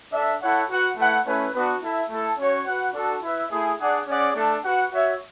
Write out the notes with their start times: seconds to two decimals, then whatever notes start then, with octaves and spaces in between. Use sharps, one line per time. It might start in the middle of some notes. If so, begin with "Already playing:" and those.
0.12 D4 A4 E5
0.41 E4 A4 C#5 F#5
0.70 F#4 B4 F#5
0.97 A3 E4 B4 F#5
1.25 A3 C#4 E4 B4
1.53 B3 D4 F#4 B4
1.82 E4 A4 E5
2.09 A3 E4 A4
2.37 C#4 F#4 C#5
2.66 F#4 B4 F#5
2.94 D4 F#4 A4
3.23 E4 B4 E5
3.50 A3 E4 G#4
3.79 D4 G#4 D5 F#5
4.06 C#4 G#4 D5 F#5
4.35 A3 D4 A4
4.64 F#4 B4 F#5
4.91 F#4 C#5 E5